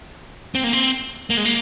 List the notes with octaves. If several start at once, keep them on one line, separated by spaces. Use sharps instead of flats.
C4
A#3
C4
A#3
G#3
A#3